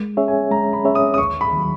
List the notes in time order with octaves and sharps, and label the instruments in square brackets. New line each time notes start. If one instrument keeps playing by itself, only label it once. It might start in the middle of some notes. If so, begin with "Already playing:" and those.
Already playing: [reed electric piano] G#3
C#4 G#4 C#5 E5
[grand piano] G#5
[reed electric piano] G#3 [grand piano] A#5
[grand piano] B5
[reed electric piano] C#4 G#4 C#5 E5
[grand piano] D#6
D#6
[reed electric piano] D#2 [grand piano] C#6
[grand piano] B5
[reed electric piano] D#3 F#3